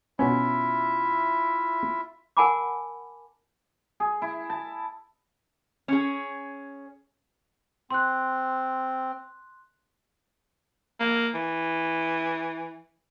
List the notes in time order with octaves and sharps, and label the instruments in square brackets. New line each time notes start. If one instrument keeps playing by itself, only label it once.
[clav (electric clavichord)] B2 B3 C#4 [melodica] E4 F4 E5
[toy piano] A#4 F#5 G#5 A5 B5 D6
[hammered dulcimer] G#4
E4
A5
[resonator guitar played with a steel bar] C#4 G#4
[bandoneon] C4 [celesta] C6 F#6
[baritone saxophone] A#3
E3